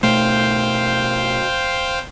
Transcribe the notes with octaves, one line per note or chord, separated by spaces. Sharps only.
B2 A3 C5 F5 G5